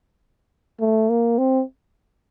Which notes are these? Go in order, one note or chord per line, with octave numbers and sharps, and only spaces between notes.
A3
A#3
C4